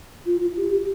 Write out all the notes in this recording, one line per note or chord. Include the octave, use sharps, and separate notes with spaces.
F4
F4
G4
G4